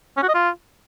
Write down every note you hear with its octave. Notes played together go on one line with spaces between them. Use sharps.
C#4
F#4
D#5
F4